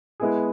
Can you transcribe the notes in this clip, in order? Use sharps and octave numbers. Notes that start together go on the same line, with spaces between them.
G#3 B3 E4 G#4